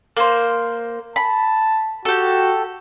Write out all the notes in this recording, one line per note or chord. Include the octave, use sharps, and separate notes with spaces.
A#3 C5
A5 B5
F#4 G4 A4